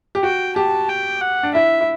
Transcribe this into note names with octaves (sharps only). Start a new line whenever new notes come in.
G4
F#4 G5
G4 A5
G5
F#5
D4
E4 E5
E4